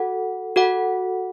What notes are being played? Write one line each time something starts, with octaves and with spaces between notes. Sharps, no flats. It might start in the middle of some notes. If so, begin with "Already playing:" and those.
Already playing: F#4 A4 F#5
F#4 A4 F#5